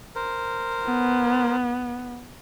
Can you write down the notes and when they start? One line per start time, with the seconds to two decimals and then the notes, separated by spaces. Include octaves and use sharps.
0.15 A#4 C5
0.84 B3